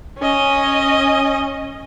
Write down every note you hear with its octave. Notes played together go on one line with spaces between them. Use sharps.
C#4 D#5